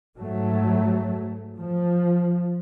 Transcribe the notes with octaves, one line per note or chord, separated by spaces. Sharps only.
G#2 F#3 A3
F3